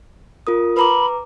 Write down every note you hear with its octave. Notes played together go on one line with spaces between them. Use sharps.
F4 A#4 D#6
B4 A#5 B5 D6